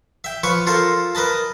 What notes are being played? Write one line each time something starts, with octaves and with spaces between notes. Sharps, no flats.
E5 G5
F3 B4 C#5 C#6
F4 A4 A#4 C5
A#4 B4 D#5 A5